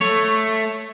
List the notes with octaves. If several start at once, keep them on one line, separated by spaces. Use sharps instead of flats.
A3 C#5